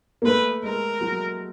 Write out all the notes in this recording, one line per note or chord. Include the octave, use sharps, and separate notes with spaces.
A#3
A3 B4
G#3 A#4
F#3